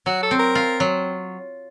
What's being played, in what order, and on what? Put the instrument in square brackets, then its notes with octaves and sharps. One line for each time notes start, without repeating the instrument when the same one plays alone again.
[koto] F#3 [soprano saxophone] F#4
[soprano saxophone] A4
[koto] C4
[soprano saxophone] A#4
[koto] F4
F#3